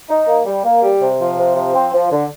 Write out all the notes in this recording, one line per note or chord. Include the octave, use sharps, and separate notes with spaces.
D#4
A#3
G3
A#3
G3
C3
F3
C3
F3
C4
F3
D3